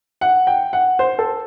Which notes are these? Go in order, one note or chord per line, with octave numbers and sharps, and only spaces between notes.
F#5
G5
F#5
C5
A4